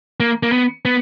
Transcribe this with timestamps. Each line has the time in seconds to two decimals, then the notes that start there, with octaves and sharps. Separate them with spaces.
0.20 A#3
0.43 A#3
0.52 B3
0.85 B3